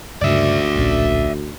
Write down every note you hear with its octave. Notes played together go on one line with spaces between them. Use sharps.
D2 G2 C#3 D5 E5
D1 A#1 C#4